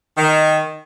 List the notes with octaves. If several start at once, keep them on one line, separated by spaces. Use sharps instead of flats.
D#3